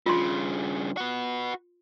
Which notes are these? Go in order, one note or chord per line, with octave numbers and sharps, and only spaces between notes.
G2 C#3 F4 C6
F#4 B4